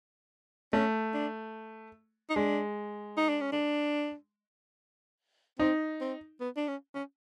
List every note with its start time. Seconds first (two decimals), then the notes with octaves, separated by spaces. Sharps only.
0.73 A3 C#4
1.14 D4
2.29 D#4
2.36 G#3 D4
3.17 D#4
3.29 D4
3.41 C#4
3.52 D4
5.59 C4 D#4
6.01 C4
6.40 B3
6.57 D4
6.68 C#4
6.95 C#4